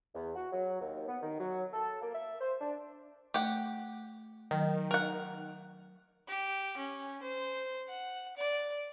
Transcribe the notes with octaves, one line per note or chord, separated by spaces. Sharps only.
E2
F#4
F#3
D#2
B3
D#3
F#3
A4
A#3
E5
C5
D4
A3 G4 F#5
D#3 F#3
A#4 F#5 F6 F#6
G4
C#4
C5
F#5
D5